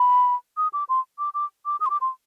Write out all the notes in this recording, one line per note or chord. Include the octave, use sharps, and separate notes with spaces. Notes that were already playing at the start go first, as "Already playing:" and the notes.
Already playing: B5
D#6
D6
C6
D6
D6
D6
D#6
C6
D6
C6